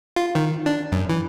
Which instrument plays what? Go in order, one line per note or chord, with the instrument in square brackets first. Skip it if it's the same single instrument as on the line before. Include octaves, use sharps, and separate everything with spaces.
[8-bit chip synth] F4
D#3
D4
F#2
E3